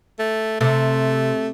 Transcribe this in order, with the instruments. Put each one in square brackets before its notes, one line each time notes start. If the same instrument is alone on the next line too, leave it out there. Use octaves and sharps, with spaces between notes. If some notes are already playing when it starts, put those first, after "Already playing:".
[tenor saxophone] A3
[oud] C3 [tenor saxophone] A3